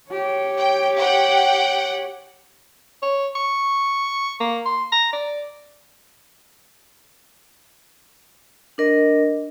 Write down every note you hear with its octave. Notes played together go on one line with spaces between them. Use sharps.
G4 C#5
G5
F#5 G5
C#5
C#6
A#3
C6
A#5
D5
D4 A#4 D#5